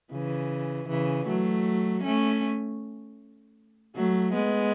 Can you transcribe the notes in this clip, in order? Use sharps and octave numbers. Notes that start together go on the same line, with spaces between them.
C#3 E3
C#3 E3
F#3 A3
A3 C#4
F#3 A3
G#3 B3